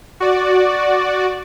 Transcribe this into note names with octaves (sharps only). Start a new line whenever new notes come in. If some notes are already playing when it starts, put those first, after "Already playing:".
F#4 D5